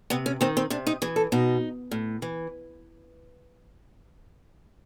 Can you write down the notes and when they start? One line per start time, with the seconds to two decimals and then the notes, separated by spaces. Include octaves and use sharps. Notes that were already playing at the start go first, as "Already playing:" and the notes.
0.10 C3 B3
0.26 C#4
0.41 D#3 C4
0.57 C4
0.70 C3 D4
0.87 D#4
1.02 E3 G#4
1.16 A4
1.32 B2 D#4
1.91 A2
2.22 E3